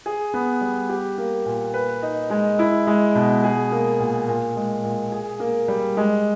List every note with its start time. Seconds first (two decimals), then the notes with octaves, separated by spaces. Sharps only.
0.06 G#4
0.34 B3
0.61 G3
0.89 G4
1.18 A#3
1.46 A#2
1.74 B4
2.02 D#4
2.30 G#3
2.59 E4
2.87 G#3
3.15 B2
3.43 G#4
3.71 A#3
3.99 A#2
4.28 A#2
4.56 G#3
4.84 A#2
5.12 G#4
5.40 A#3
5.68 G3
5.97 G#3